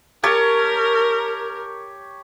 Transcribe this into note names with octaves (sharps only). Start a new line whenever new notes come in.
G4 A#4 C#5 A5